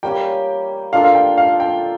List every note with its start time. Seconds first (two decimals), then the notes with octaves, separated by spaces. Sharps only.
0.03 G3 A#3 C#4 G4 G5
0.93 A#3 D4 F4 A4 F5
1.04 F5
1.15 G5
1.38 F5
1.60 G5